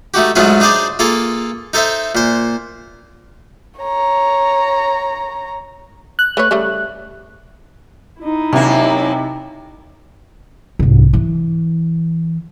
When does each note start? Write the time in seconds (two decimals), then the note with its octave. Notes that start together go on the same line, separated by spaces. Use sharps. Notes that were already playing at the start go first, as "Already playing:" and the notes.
0.14 A3 D#4 F#4 G4
0.36 G#2 F#3 A3 B3 F4 G#4
0.60 D4 D#4 G#4 C5 D5
0.99 A#3 F4 G#4 A4
1.73 D#4 A4 C5 E5
2.15 A#2 C5
3.80 C#5 A#5
6.19 F#6
6.37 A3 B4 C#5
6.51 C#3 G3 A3
8.21 D#4 E4
8.53 F#2 C3 A#3
10.79 C2 G#2
11.13 E3